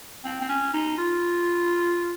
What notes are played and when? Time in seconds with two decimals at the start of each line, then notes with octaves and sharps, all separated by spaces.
0.24 C4
0.41 C4
0.49 C#4
0.73 D#4
0.98 F4